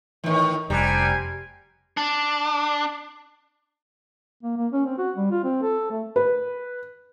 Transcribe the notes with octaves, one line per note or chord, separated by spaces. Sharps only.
A2 D#3 E3
F1 G3 C4 D4 G#5 A#5 C7 D7
D4
A#3
A#3
C#4
C4
F#4
G3
F4
C4
A4
A3
B4